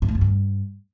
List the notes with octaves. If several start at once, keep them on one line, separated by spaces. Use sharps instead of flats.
G#2
A2
F#2
G2